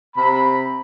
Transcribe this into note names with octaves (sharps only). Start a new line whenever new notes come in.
C3 C4 B5